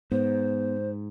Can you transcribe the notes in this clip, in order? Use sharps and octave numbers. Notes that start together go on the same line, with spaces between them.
G#2 B3 C5